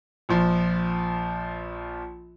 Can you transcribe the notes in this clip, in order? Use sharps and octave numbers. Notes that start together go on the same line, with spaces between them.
A#1 F3